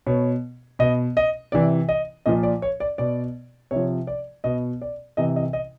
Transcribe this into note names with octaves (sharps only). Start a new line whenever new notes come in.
B2 C#5
B2 D#5
D#5
C3 E3 D5
D#5
A#2 F3 D#5
D5
C#5
D5
B2 D5
C3 F3 C#5
D5
B2 D#5
D5
C3 E3 D#5
D#5
D#5